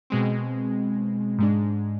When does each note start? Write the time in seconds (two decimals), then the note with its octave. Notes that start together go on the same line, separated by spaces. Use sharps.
0.10 B2 G#3 C4
1.38 G#2 G#3 D4